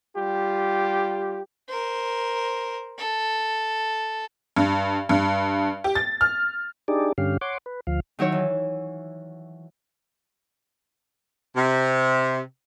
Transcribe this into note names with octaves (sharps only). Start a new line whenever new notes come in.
G3 F4 G4
A#4 C5
A4
G2
G2
G4
A6
F6
D4 D#4 G4 G#4 D5
G2 D3 C#4 G4 F5
C#5 F#5 C6 D6
B4
D2 F3 F5
D#3 F#3 E4 C#5
E3
C3